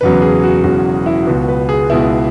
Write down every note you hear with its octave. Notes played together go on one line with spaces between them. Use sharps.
E1 E2 C#3 F#3 B4
G#4
F#4
E1 E2 C#3 F#3 F#4
E4
C#2 B2 B3 F#4
B4
G#4
C#2 B2 B3 E4